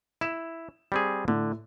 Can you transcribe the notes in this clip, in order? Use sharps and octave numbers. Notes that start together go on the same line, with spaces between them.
E4 E7
G3 C4 G#4
A2 D3